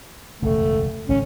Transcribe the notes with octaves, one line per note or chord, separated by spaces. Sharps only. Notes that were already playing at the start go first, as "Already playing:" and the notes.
E1 C#2 F#2 A3
G#1 C#2 G#2 C#4